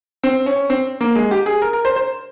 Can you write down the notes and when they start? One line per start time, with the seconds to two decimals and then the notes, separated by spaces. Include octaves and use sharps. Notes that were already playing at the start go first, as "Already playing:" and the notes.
0.24 C4
0.46 C#4
0.70 C4
1.01 A#3
1.15 G#3
1.31 G4
1.46 G#4
1.62 A#4
1.73 A#4
1.85 C5
1.96 C5